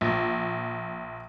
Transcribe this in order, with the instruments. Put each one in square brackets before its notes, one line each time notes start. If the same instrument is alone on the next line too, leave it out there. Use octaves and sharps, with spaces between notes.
[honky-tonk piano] A#1